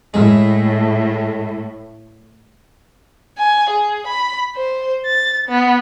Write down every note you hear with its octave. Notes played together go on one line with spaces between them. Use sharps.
A2 G#3
G#5
G#4
B5
C5
A6
B3